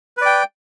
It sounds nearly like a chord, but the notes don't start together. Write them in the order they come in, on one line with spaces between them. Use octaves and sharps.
B4 D5 G5